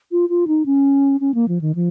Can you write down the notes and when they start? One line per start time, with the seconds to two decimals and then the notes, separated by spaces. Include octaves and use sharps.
0.11 F4
0.29 F4
0.47 D#4
0.66 C#4
1.20 C#4
1.34 A#3
1.48 F3
1.61 D#3
1.75 F3